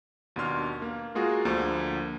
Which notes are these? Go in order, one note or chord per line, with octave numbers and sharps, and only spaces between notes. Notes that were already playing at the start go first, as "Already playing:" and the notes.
D#2 B2 D4 F#4 C6 F6
A#3
G#3 A#3 F4 F#4 G#4 A#4
D2 D3 F3 A#3